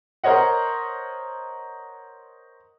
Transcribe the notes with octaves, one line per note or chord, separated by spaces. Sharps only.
A#4 C5 C#5 D#5 F#5